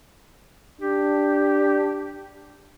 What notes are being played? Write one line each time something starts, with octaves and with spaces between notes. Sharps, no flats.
D4 G4